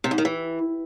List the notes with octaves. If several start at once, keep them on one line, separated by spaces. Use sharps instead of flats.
C3
G#2
D#3
E3